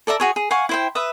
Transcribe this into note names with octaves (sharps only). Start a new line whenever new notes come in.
A4 D5 E5 A#5
F#4 G#4 C#5
G#4
F5 F#5 G#5 C#6
E4 C5 G5
B4 E5 D#6